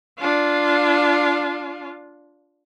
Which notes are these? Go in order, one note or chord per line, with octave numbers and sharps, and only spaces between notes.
D4 F4